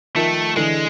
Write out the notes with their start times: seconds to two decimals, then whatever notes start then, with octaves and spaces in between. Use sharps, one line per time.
0.16 D#3 F3 A3
0.56 D3 E3 G#3